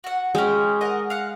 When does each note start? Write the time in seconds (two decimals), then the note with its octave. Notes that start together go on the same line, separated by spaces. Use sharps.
0.04 F#4 F#5
0.35 G#3 C#4 G5
0.81 A#4 D#5 F#5
1.10 F5 F#5